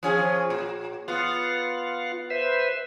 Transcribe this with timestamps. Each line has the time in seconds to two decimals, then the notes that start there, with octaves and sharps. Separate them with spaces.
0.03 F3 C#4 G#4
0.50 A#2
1.08 B3 F4 F5 F#5
2.30 B4 C5 E5